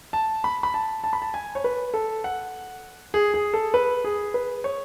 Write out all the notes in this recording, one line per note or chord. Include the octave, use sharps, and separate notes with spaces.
A5
B5
B5
A5
A5
B5
A5
G#5
C#5
B4
A4
F#5
G#4
G#4
A4
B4
G#4
B4
C#5